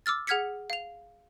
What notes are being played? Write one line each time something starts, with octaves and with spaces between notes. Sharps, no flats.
D6 E6 F6 A6
G#4 F#5 F6 G#6 B6 C#7
F5 F7